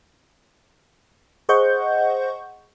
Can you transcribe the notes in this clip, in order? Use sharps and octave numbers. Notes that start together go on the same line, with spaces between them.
G#4 C5 D#5 F#5 C#6 G6